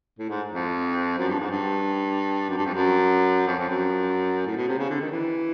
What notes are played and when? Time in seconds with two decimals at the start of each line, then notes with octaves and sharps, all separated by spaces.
0.19 A2
0.30 G#2
0.53 F2
1.18 F#2
1.29 G2
1.39 G#2
1.51 G2
2.49 F#2
2.57 G2
2.66 F2
2.73 F#2
3.47 F2
3.58 F2
3.69 F#2
4.46 A2
4.56 B2
4.68 C3
4.79 C#3
4.90 D3
5.01 D#3
5.12 E3